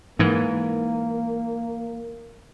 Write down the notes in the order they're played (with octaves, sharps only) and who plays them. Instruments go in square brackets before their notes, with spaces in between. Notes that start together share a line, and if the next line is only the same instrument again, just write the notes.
[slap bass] G#2 E3 [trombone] A#3